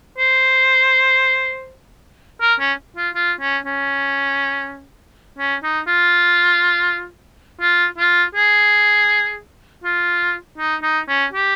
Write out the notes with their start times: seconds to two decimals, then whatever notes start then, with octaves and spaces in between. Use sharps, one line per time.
0.18 C5
2.41 A#4
2.60 C#4
2.96 F4
3.15 F4
3.40 C#4
3.65 C#4
5.38 C#4
5.63 D#4
5.87 F4
7.61 F4
7.98 F4
8.35 G#4
9.84 F4
10.58 D#4
10.82 D#4
11.08 C#4
11.33 G4